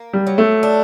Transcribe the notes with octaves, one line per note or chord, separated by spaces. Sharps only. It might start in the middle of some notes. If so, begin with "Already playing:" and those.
Already playing: A#3
G3
F#3
A3
D4